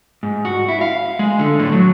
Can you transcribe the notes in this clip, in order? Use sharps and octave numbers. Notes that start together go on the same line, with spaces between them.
G#2
F#4
E4
F5
G#3
D3
A2
F#3